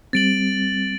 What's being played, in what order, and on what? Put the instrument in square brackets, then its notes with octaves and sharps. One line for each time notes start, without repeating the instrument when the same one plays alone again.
[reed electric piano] G3 C4 [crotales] A6 D7 F#7